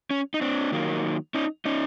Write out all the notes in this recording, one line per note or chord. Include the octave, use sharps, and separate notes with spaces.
C#4
D#4
C4 D4
D#3 F#3 A#3
C#4 D#4
C#4 D#4